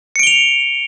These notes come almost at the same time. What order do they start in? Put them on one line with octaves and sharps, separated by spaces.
C#7 D7 G7 F7